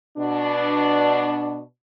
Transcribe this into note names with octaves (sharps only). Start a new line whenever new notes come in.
B2 D4